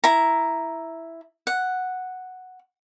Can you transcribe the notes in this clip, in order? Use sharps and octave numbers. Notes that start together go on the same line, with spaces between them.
E4 A#5
F#5